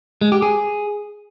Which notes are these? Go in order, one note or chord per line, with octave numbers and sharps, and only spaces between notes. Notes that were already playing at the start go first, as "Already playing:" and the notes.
G#3
G4
G#4